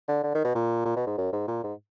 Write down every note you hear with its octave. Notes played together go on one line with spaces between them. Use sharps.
D3
D3
D#3
B2
A#2
A#2
B2
G#2
F#2
G#2
A#2
G#2